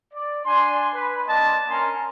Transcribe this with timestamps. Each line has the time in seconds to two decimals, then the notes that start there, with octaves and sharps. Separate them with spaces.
0.13 D5
0.45 D4 G#5 C6
0.93 B4
1.27 A#3 D4 D#5 A5 C6
1.69 C#4 A#4 G#5 A#5 C6